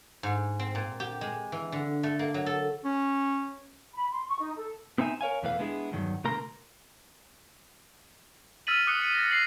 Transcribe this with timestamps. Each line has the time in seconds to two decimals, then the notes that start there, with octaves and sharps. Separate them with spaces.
0.23 G#2
0.59 C4
0.75 A#2
1.00 G4
1.21 G#3
1.52 E3
1.72 D3
2.03 A3
2.19 A#3
2.34 F#3
2.46 A4
2.84 C#4
3.94 B5
4.11 C6
4.28 C#6
4.40 D#4
4.57 A4
4.98 B3 C4 D#4 E5 G#5
5.21 A#4 C#5 F5 G#5
5.43 E2 B2 E3 A3 B4 F5
5.59 G#3 B3 D4 E4 G#4
5.92 E2 G2 D#3 E3 F#3
6.24 B2 D3 A3 A#4 A#5 C6
8.67 E6 F6 A6 B6 D#7 F#7
8.87 D6 D#6 F#6 C#7
9.02 C#7 D#7
9.14 A6 A#6
9.31 A#6 C7 C#7 F#7